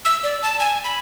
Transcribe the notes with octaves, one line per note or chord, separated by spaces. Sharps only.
E6
D5
A5
G#5
B5